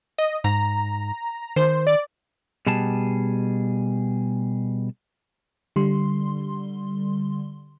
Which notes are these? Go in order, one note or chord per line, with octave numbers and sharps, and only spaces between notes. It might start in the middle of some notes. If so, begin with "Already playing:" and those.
D#5
G#2 A#5
D#3 C5
D5
B2 G3 G#4 A5
D3 G3 C6